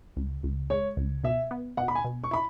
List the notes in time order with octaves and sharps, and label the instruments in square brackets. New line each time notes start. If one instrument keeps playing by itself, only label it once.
[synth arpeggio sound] C#2
C#2
[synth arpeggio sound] G#3 [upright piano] C#5
[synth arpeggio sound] C#2
[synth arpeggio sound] B2 [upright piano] E5
[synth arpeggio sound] B3
[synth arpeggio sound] B2 [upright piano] F#5
[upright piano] B5
G#5
[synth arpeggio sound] B2
[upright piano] C#6
[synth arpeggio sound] E4 [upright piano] B5